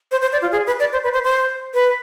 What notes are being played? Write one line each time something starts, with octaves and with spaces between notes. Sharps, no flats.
C5
C5
D5
F4
G#4
B4
D5
C5
B4
C5
C5
B4